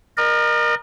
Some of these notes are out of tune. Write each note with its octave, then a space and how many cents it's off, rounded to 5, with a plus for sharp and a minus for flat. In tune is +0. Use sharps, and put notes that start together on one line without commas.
A#4 +15 D#5 -40